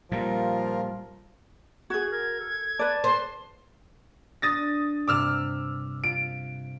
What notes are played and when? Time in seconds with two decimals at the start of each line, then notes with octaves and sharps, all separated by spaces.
0.12 A#2 F3 G3 F4 A#4
1.90 F#4 G#4 G#6
2.11 A#4 G#6
2.40 A4
2.79 B4 D5 A5
3.04 C5 C6
4.42 D4 D#6 A6 A#6
5.08 G2 C3 D6 E6 F6
6.04 F4 D7